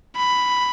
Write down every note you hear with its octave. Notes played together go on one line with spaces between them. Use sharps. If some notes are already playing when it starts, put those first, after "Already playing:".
B5